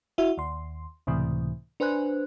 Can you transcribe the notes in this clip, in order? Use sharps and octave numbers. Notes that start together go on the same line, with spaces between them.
E4 F#4 E5
D#2 C6
C#2 A2 C3 E3
D4 B4 C5 G#5 F#6